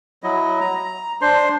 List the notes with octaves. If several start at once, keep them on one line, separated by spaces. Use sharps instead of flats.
F#3 E4 D#5
A#5
D4 C5 C6